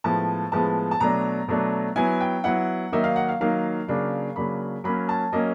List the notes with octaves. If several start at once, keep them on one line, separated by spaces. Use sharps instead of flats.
A2 F3 G#3 B3 A5
A2 F3 G#3 B3 A5
A5
B2 F#3 A3 D4 A#5
B2 F#3 A3 D4
F#3 B3 E4 G#5
G5
F#3 B3 E4 F#5
D#3 F#3 A#3 D#4 E5
F5
F#5
F5
D#3 F#3 A#3 D#4 F5
C#3 F#3 A#3 D4
C#3 F#3 A#3 D4 B5
F#3 A#3 C#4 B5
A5
F#3 A#3 C#4 D#5